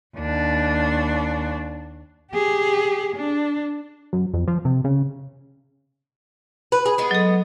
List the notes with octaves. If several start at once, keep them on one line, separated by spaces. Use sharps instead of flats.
D#2 D4
G4 G#4
D4
F#2
F2
F3
C3
C#3
B4
G#4
G#3 B3
F#3 A4